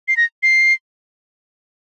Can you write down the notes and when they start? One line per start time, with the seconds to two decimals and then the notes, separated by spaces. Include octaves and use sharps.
0.08 C7
0.17 A#6
0.43 C7